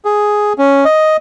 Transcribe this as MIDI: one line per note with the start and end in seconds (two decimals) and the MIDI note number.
0.05 0.53 68
0.58 0.84 61
0.85 1.17 75